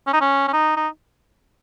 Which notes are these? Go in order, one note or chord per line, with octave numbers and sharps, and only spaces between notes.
C#4
D#4
C#4
C#4
D#4
D#4